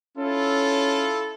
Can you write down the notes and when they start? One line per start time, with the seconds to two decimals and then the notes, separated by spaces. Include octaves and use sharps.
0.17 C#4 E4 F4 A4